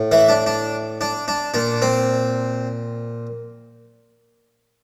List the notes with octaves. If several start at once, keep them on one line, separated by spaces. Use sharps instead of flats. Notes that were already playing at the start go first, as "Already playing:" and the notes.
Already playing: A2
E3 E4
D4
D4
D4
D4
A#2 D4
C4